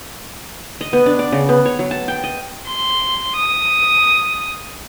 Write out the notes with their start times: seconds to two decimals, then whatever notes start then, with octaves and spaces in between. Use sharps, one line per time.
0.81 D#5
0.93 B3
1.06 D4
1.19 D5
1.32 C#3
1.49 B3
1.65 C#5
1.79 F#3
1.91 A5
2.08 G5
2.24 D#5
2.67 C6
3.36 D#6